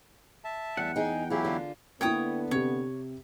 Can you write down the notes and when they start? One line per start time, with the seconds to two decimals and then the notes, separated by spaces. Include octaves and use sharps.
0.44 E5 A5
0.77 E2 G3 F#5
0.96 D#4 G#4 G5
1.30 F#3 E4 F4 G4 G#4
1.45 D3 F4
2.01 D3 A#3 B3 E4 C#5 G5 D#6
2.51 C3 G4 C#5